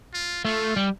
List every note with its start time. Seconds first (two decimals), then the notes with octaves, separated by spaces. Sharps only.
0.14 F4
0.45 A3 F4
0.76 G3